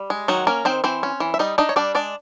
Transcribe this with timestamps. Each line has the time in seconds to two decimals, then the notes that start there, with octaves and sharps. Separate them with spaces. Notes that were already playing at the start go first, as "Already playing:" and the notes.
Already playing: G3
0.10 G#3
0.28 D#3 F#3 F#4
0.47 A#3 C#4 A#4
0.65 D#3 C4 C5
0.84 E3 C4 C5
1.03 C#4
1.20 E3
1.34 E5
1.39 G3 D#4 D#5
1.58 D4 D#4 D#5
1.69 C#5
1.76 G3 D4 D5
1.95 G#3 D4 D5